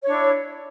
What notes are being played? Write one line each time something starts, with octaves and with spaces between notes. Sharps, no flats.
D4 E4 C#5